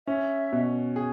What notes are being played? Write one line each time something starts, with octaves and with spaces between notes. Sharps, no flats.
C#4 E5
B2
G#4